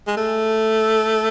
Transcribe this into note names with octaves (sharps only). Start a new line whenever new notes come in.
G#3
A3